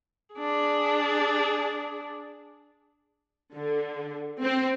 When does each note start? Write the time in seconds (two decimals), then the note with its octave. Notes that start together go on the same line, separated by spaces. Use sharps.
0.35 D4 G#4
3.55 D3
4.42 C4